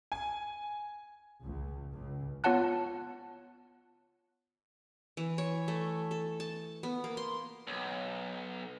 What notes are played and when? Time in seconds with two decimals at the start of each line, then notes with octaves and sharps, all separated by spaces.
0.12 G#5
1.43 C#2
1.94 C#2
2.44 B3 F4 C#5 F#5 A5 F#6
5.17 E3
5.38 C#5
5.68 A3
6.11 A4
6.40 A5
6.83 B3
7.04 A#3
7.17 C6
7.67 B1